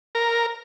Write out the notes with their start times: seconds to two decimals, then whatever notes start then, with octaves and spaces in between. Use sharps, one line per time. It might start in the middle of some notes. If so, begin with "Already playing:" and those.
0.15 A#4